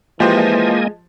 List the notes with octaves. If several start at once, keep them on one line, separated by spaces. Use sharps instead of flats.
E3 F3 G#3 A#3 G4 C5 D#5 G#5